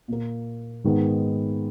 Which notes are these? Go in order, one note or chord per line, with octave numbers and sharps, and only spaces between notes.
A#2 A#3
G#2 D#3 G#3 B3